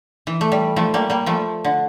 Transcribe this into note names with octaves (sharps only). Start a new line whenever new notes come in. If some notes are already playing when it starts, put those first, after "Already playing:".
E3
A3
G3
F3 A3
G3 A#3
G3 A#3
F3 A3
D3